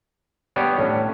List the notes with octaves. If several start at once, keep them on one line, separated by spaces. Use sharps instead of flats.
G3 B3 D4 G4 B4 C#5
A2 C#4